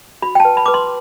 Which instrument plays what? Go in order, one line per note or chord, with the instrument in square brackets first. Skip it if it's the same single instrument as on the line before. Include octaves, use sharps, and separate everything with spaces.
[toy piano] F#4 B5
G5
A5
B4
B5
B4 D6
C6